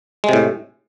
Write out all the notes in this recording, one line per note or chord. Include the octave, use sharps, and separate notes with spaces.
A2 C3 G#3